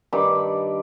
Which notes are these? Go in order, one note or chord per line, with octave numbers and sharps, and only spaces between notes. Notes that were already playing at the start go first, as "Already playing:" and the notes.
G2 D#3 D5 B5